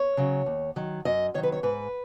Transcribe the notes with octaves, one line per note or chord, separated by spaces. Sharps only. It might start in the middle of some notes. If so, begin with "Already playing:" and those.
Already playing: C#5
C#3 F#3
D#2
D#3 F#3
F#2 D#5
D#3 F#3 C#5
B4
C#5
G#2 B4